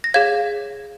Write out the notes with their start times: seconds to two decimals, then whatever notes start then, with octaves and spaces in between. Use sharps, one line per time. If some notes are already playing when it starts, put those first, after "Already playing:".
0.04 A#6
0.14 G#4 C#5 F5 G#6